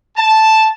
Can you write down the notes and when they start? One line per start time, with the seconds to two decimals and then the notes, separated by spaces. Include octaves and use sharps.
0.16 A5